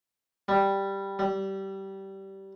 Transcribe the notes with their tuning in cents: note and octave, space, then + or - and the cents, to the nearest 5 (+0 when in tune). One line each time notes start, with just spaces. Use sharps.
G3 +0
G3 -20